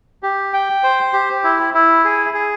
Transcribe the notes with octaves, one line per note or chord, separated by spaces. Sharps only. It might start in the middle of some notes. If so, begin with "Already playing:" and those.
G4
G5
C5
G4
E4
E4
G#4
G#4